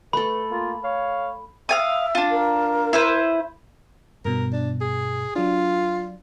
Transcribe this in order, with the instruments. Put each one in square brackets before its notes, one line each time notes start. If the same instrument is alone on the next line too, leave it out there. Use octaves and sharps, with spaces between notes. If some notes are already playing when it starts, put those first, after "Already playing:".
[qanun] A3 A4 [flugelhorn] B4 [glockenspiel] B5
[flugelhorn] A#3 [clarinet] F4
[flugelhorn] C#5 [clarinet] F5
[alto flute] E5 [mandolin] F5 G#5 D#6
[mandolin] D4 F4
[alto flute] A#4
[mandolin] E4 B4 C5
[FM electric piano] G2 B2 [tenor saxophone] A#4
[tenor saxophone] D4
G#4
[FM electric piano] F#3 D4 [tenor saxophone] F4